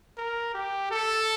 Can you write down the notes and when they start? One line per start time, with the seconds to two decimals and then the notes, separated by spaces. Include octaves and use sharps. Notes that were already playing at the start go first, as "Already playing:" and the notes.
0.17 A#4
0.54 G4
0.91 A4